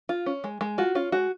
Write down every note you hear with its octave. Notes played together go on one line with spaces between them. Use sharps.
F4
C#4
G#3
G#3
F4 F#4
C#4 F4
G#3 F#4